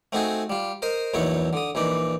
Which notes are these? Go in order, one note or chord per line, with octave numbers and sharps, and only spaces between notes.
A3 C4 D#4 F#4 G#4
G3 F4
A#4 C5 D#5
A#1 E2 F#3 D#4 E4 C#6
D3 D#6
A#1 E3 D#4 D5